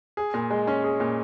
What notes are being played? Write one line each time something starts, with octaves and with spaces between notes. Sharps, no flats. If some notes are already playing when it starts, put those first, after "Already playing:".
G#4
A#2
G#3
C#4
G#4
A#2